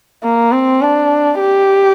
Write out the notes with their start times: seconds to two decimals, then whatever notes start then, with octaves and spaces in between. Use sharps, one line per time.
0.24 A#3
0.52 C4
0.82 D4
1.39 G4